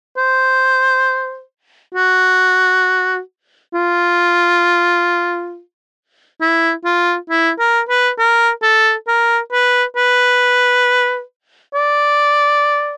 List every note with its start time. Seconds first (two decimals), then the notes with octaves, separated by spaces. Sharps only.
0.17 C5
1.95 F#4
3.74 F4
6.41 E4
6.85 F4
7.30 E4
7.59 A#4
7.89 B4
8.19 A#4
8.63 A4
9.08 A#4
9.53 B4
9.96 B4
11.74 D5